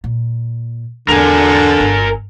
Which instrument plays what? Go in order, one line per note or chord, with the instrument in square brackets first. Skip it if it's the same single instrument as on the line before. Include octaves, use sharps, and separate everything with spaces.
[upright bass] A#2
[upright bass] E2 [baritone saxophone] D3 [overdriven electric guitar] A#4 G#5
[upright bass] G1